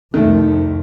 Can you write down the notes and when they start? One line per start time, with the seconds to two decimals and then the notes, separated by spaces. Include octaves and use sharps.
0.14 C2 F2 D#3 A3